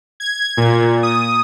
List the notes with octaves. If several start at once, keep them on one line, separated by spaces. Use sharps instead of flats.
G#6
A#2
D#6